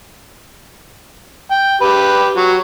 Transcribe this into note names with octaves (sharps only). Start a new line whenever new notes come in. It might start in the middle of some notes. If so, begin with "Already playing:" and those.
G5
G4 B4
F#3